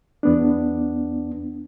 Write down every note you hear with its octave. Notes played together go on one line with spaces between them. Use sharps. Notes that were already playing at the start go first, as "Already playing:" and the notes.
E2 B3 D4